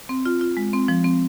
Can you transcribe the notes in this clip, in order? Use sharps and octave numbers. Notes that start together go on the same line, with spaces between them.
C4
F4
F4
G#3
C4
F3
C4